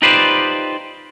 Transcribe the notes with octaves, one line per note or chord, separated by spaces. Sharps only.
D#4 F4 G4 B4 C5 D5